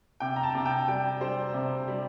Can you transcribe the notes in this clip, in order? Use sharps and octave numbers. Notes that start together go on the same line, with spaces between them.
C3 G5
A#5
A5
C3
G5
G3 G5
G3 C5
C3
G3